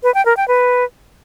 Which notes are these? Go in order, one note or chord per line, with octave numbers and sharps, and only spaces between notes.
B4
G5
A#4
G5
B4